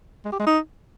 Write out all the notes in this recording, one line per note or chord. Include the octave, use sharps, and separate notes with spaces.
G#3
G4
G#3
D#4